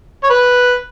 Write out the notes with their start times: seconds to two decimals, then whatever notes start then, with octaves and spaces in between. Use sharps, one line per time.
0.23 C#5
0.30 B4